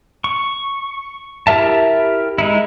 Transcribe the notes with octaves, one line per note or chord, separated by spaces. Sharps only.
C#6
E4 G4 A#4 E5 A5
G#3 D#4 E4